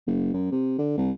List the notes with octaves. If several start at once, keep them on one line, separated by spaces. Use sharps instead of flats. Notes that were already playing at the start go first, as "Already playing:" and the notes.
F#1
F#2
C3
D3
C2